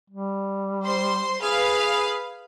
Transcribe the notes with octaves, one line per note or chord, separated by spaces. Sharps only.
G3
C5 C6
G#4 B4 F5